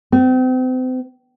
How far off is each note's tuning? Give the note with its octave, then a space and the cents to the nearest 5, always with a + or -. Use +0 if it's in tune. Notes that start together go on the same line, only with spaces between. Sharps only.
C4 -35